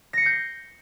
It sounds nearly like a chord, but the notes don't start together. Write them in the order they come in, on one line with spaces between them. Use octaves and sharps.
A#6 C#7 C7 G6